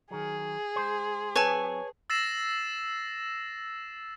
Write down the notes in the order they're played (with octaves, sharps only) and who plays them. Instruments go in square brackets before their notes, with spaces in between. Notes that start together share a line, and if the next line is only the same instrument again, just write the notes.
[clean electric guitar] D#3 F#3 [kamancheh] G#4
[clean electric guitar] G#3 C5
[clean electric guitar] F#3 C4 [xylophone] B4 A5 [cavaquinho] C#5 G#5
[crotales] E6 A6 A#6 C7 E7